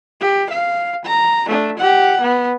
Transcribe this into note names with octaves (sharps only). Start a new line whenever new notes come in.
G4
F5
A#5
A3 D4
G4 F#5
B3